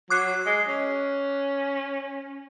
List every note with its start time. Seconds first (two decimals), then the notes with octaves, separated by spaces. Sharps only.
0.10 F#3 D6 F#6 C7
0.46 G#3
0.69 C#4